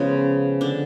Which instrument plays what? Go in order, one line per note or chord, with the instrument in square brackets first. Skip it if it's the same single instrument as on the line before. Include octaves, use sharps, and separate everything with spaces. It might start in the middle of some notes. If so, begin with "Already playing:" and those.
Already playing: [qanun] C#3 F3 G#3 B3 C#4
D3 D4